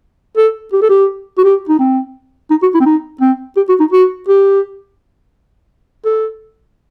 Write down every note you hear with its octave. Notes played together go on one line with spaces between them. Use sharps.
A4
G4
A4
G4
F#4
G4
D#4
C4
D#4
F#4
E4
C4
D#4
C4
G4
F#4
D#4
F#4
G4
A4